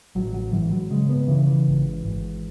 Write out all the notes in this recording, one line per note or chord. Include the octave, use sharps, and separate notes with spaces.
A1 F#3
F#3
G#2 E3
F#3
C#3 G#3
B3
C#3 E3
E3
G#1
G#1